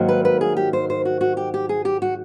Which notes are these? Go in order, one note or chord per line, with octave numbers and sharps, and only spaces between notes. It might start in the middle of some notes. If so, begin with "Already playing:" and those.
Already playing: G#2 D#3 F#3 A#3
B4
B4
G#4
G4
C5
C5
F#4
F#4
G4
G4
G#4
G4
F#4